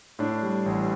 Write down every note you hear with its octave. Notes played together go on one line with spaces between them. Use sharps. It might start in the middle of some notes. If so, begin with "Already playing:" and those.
A2 D4
G3
A1